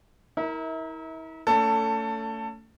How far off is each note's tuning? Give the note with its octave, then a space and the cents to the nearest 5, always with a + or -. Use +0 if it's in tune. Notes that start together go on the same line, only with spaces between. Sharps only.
E4 -40 A#4 +0 E5 -35
A3 +25 C#4 +35 A4 +15